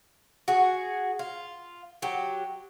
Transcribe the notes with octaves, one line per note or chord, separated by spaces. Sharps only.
F#4 G#4
F4
F#3 G4